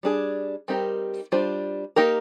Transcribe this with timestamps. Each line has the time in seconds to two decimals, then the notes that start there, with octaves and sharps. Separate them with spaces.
0.03 G3 D4 G#4
0.68 G3 C4 D#4 G4 A#4
1.32 G3 D4 F4 C5
1.96 A#3 D#4 G4 A#4